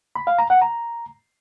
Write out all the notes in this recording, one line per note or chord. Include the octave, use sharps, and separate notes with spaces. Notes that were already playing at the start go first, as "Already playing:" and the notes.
B5
F5
A#5
F#5
A#5